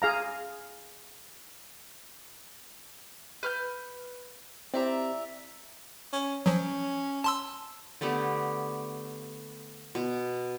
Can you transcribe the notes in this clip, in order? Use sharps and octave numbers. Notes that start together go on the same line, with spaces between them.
G#4 F5 A#5
B4 F6 G6
C4 E4 G4 D5 E5 A#5
C#4
F3 F#3 C#4
A5 C6 E6
D3 A3 B3 G4
B2